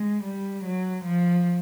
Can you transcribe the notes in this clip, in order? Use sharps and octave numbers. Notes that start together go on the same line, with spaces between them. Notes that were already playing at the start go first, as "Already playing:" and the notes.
Already playing: G#3
G3
F#3
F3